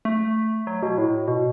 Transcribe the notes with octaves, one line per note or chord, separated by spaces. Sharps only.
A3
F#3
B2
A2
B2